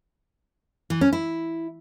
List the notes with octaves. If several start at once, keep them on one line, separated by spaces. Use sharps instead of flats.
E3
C#4
E4